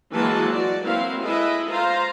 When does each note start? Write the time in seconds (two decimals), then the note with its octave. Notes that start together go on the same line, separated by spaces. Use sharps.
0.13 E3 F#3 G#3 A#3 B4 A5
0.53 F#4 D5
0.84 F#3 A#3 C4 E4 B4 F5
1.21 G#3 E4 A4 B4 D#5 E5
1.69 F4 C5 F5 A#5